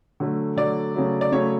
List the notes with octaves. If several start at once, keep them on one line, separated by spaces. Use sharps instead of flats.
D3 F#3 A3
D3 F#3 A3 D5
C#3 F#3 A3
D5
C#3 F#3 A3 C#5